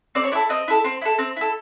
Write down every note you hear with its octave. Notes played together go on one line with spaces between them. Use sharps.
C4 D5
C#5
E4 A4 D5
C4 D#5
E4 A4
C4
E4 A4
C4
E4 A4